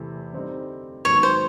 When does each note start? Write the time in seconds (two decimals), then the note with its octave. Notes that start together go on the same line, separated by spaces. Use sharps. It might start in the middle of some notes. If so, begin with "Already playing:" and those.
Already playing: E2 C3 E3 A3
0.33 D3 G3 C4 D#4
1.05 G#2 D#3 F#3 B3 C#5
1.23 C5